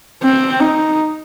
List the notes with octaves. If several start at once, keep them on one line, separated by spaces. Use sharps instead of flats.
C4
D#4